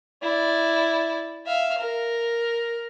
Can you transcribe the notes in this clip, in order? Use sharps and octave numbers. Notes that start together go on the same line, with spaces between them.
E4 D5
E5 F5
A#4